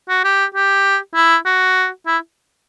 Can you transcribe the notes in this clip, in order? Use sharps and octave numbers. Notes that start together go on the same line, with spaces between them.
F#4
G4
G4
E4
F#4
E4